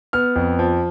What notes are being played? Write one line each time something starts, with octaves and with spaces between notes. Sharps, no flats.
B3 F6
F2
F3